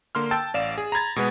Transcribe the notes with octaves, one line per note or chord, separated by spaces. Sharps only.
D3 A#3 C6 F6
G5 A5 E6 A6
A1 D5 F5 E7
G#4
A#5 B5 G#6 A6
B2 G#3 B3